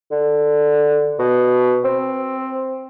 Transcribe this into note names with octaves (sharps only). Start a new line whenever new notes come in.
D3
B2
C4